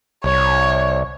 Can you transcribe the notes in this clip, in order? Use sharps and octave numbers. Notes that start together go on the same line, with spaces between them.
C2 C#5